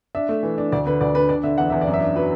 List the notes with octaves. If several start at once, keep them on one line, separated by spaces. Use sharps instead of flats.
D4 E5
A3
E3
D4
D2 D5
D3 B4
D2 D5
D4 B4
D4 D5
D3 E5
E2 F#5
E2 E5
D5
F#2
E5
D4
F#3 B4